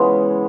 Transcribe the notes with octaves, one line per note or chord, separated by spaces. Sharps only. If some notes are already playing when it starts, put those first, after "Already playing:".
Already playing: C#3 E3 G#3 B3